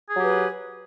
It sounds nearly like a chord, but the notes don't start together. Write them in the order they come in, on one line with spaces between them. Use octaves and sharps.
G#4 F#3 G4 B4